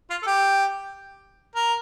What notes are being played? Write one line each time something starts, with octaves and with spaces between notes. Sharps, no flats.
F4
A4
G4
A#4